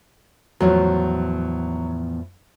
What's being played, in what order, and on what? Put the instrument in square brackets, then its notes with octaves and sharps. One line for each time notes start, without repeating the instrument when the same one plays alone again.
[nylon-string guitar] E2 A2 F3 [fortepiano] F#3